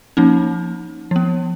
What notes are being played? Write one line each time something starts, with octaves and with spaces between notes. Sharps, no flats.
F3 A#3 C#4 D#4
F3 B3